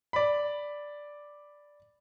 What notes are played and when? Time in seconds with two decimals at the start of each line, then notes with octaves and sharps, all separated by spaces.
0.13 D5 B5